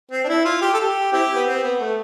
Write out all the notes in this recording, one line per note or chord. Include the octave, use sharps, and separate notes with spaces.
C4
D4
E4
F4
G4
A4
G4
C4 E4 G4
B3
C4
B3
A3